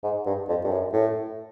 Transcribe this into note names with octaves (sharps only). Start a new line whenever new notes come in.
G#2
G2
F2
G2
F#2
A2